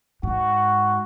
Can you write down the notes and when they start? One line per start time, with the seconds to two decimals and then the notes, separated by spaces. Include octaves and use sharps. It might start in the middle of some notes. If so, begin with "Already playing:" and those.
0.23 G#2 F#4